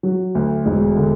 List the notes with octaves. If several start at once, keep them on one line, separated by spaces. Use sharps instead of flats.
F#3
D2
E1
D3